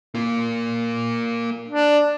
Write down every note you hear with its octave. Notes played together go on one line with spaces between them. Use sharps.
A#3 F4
D4